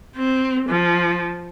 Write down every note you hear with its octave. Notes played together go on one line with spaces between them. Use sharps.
C4
F3